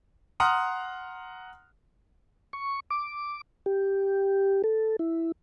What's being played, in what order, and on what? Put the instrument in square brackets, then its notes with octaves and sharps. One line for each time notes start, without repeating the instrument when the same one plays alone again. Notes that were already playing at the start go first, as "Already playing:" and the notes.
[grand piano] F#5 A#5 C6 D#6 F6
[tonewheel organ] C#6
D6
G4
A4
E4